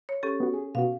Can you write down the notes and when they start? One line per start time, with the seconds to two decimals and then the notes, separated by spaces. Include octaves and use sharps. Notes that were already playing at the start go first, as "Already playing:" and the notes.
0.09 C#5
0.23 C#4 G4 A4
0.40 B3 F#4
0.54 G#4
0.75 B2 B3 F#4 F5